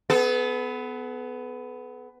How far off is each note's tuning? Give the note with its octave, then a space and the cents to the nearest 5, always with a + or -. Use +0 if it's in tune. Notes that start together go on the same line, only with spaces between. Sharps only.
B3 +15 A4 -40